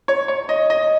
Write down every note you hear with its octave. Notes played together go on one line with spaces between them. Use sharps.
C#5
C#5
D#5
D#5